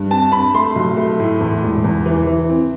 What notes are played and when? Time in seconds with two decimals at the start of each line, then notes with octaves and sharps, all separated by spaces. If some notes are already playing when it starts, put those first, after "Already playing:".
Already playing: G2
0.11 C4 A5
0.32 C4 B5
0.54 A3 C6
0.76 B1
0.97 A3
1.19 A2
1.40 E2
1.63 E1
1.84 E2
2.06 E3
2.27 E3
2.49 C4